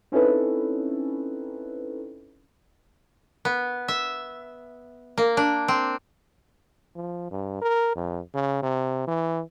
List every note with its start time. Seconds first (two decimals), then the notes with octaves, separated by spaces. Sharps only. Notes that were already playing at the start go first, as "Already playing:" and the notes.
0.12 C4 C#4 D#4 E4 A4 B4
3.45 B3
3.88 E5
5.18 A#3
5.37 D4
5.68 C4
6.96 F3
7.31 G2
7.61 A#4
7.96 F2
8.34 C#3
8.63 C3
9.08 E3